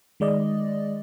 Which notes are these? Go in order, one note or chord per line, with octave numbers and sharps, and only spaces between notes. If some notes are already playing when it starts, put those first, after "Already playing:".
D#3 G#3 D5 D#5